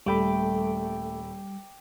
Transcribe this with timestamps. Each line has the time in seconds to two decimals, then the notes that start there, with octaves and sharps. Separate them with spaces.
0.06 D#1 G3 A3 A4 G5 B5 D6